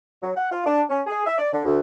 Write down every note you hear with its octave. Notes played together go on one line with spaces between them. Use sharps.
F#3
F#5
F4
D4
C#4
G#4
E5
D5
D3
D2